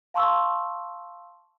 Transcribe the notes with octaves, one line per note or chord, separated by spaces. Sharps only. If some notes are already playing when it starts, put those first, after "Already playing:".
F5 A5 C6 C#6 E6